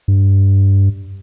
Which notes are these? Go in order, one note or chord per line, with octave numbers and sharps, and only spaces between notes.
G2